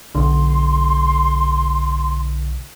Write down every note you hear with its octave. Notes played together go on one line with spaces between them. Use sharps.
B1 D3 C6